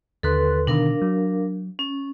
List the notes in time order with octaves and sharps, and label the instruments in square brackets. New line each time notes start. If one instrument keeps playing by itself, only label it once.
[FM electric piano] D#2 D3 F#6 [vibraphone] A4 B4 C6
[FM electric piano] B2 D3 D#3 [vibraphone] D4 A#4 F5
[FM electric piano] F#3
[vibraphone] C#4